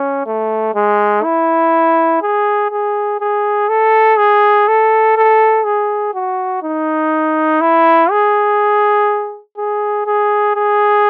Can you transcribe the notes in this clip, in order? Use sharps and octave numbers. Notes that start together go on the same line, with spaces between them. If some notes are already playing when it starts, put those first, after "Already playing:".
Already playing: C#4
A3
G#3
E4
G#4
G#4
G#4
A4
G#4
A4
A4
G#4
F#4
D#4
E4
G#4
G#4
G#4
G#4